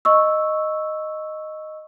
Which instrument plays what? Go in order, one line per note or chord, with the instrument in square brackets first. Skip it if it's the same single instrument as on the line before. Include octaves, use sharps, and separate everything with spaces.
[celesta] D#5 C#6 E6